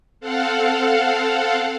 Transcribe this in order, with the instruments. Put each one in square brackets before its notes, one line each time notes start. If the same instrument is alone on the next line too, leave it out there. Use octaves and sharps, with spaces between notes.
[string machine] C4 A4 F5 F#5